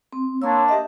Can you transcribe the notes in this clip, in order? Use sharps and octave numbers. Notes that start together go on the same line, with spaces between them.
C4
A#3 D4 C#5 C6 E6
G4 D#5 E5